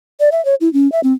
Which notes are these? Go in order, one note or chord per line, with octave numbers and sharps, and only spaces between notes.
D5
E5
C#5
E4
C#4
E5
C4